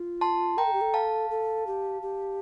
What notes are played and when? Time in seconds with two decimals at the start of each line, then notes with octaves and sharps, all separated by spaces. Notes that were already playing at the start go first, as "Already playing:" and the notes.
Already playing: F4
0.21 A5 C6
0.57 A#4 G5 A#5
0.66 A4
0.73 G4
0.81 A4
0.94 F5 A5
1.30 A4
1.67 G4
2.02 G4